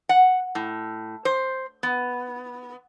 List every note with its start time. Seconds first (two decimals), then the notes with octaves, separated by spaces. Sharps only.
0.09 F#5
0.55 A2
1.25 C5
1.83 B3